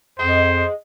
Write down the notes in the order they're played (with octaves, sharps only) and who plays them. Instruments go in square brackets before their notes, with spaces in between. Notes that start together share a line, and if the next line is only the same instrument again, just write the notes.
[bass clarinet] F2 [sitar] G#3 B3 D#5 [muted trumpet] C5